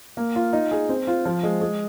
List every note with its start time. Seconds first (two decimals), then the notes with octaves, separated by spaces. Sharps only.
0.17 A#3
0.35 F4
0.53 D#4
0.71 G#4
0.89 C4
1.07 F4
1.25 F3
1.43 G#3
1.61 G#3